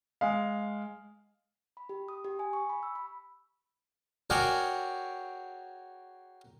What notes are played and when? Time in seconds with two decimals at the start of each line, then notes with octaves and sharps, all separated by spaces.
0.21 G#3 F5
1.77 B5
1.89 G4
2.09 D#6
2.24 G4
2.39 G#5
2.53 C#6
2.69 B5
2.83 E6
2.95 B5
4.30 F#4 G#4 A#4 C#5 D5 G5